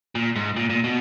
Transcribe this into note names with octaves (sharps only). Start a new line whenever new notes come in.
A#2
G#2
A#2
A#2
B2